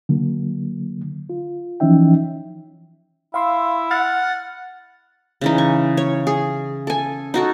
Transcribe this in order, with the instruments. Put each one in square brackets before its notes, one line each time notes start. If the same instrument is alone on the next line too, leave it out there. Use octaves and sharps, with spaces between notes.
[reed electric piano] D3 F#3 A#3
F4
E3 F3 C#4 D#4 E5 G5
[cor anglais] E4 [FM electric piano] F5 C6 E6
[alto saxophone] F#5 [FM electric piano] F6 A6
[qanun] C#3 E3 D#4
C#6
C#5
G#4
A4 G#5
D#4 F#4 A4